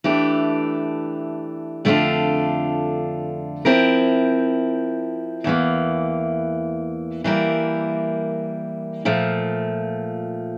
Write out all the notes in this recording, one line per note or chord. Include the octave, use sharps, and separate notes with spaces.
E3 A3 D4 G4
F2 D3 A3 D4 F4
F3 C4 E4 A#4
E2 E3 A#3
E3 G3 A#3 E4 A#4
A#2 F3 A3